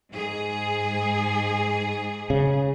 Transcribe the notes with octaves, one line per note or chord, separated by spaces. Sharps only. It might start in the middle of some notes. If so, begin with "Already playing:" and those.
G#2 G#4
C#3